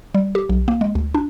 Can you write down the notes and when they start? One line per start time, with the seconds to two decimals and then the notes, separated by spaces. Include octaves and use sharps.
0.15 G3
0.35 G4
0.49 B1
0.68 A#3
0.81 G#3
0.95 D2
1.15 D4